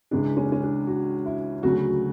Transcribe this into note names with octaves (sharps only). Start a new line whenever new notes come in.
C#2 C#3 E3 G#3 D4
C#4
D4
C#4
D4
F#4
E4
D2 C#3 F#3 F#4